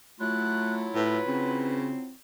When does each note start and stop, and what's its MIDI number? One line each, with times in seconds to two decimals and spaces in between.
0.20 2.13 54
0.20 0.92 57
0.20 2.13 64
0.20 2.13 65
0.20 0.73 90
0.95 1.19 45
0.95 1.77 71
1.27 1.94 49
1.27 2.13 60